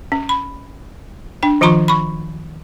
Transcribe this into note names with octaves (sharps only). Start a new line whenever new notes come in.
C#4
B5
D4 G5
D#3 F3 F4 A#5 C6 C#6
B5 C#6